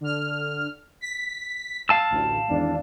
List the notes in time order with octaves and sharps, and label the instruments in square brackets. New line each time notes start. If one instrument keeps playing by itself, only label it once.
[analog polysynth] D3 F6
B6
[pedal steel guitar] F5 A5 E6
[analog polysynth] A1 D2
G#1 E2 D4